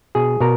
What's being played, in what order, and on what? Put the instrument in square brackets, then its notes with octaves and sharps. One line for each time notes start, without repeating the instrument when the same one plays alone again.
[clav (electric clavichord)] B2 G#4
B2 A#4